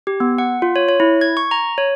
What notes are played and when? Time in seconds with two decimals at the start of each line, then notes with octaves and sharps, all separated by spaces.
0.07 G4
0.20 B3
0.38 F#5
0.62 F4
0.76 C#5
0.89 C#5
1.00 E4
1.21 G#6
1.37 C#6
1.51 A#5
1.78 C#5